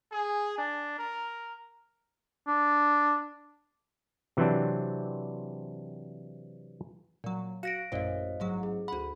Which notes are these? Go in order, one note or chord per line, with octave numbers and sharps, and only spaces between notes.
G#4
D4
A#4
D4
C3 E3 F#3 C4 D4
A#2 F#3
F#4 F5 A#6 D7
A1 F#2 A#2 C5 D#5 F5
A1 G#2 F#3
G#4
D2 F#5 B5